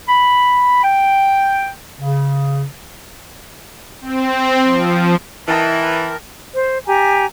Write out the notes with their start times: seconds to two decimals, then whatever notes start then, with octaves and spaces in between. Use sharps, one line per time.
0.09 B5
0.84 G5
2.00 C#3
4.01 C4
4.63 F3
5.48 E3 D#4 A#4 G5 A5
6.54 C5
6.87 G4 G#5 A#5